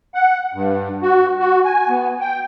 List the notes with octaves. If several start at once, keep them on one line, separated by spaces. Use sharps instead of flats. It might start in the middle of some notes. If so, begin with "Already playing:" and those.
F#5
G2
F#4
F#4
G#5
B3
G5